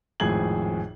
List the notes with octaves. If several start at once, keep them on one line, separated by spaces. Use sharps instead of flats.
G#1 F2 A2 G#4 G#6 F#7